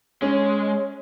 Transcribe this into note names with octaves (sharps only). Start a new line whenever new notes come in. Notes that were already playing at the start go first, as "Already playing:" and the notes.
G#3 C#4 C#5